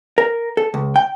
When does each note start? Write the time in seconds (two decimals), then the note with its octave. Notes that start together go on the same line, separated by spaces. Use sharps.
0.18 A#4
0.57 A4
0.74 C#2
0.96 G5